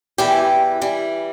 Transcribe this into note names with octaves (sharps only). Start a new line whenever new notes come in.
E2 E3 G3 E4 G4
E3 G3